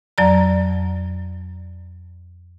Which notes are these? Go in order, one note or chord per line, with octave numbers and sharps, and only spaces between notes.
F2 F#3 D5 A#5